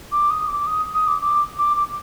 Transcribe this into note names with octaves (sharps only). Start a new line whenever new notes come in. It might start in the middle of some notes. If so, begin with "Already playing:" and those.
D6
D#6
D6
D#6
D#6
D6
D6
D6
D6